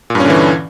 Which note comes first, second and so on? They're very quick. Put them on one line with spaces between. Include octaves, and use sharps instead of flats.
A#2 G2 C#4 D3 E3